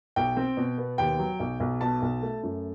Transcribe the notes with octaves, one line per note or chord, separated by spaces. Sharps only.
B1 G5
C4
B2
B3
D#2 G5
F#3
B1
B1
B2 A5
B1
A3
F#2